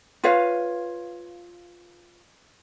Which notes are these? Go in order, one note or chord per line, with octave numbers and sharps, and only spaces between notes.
F4 B4 C#5 F5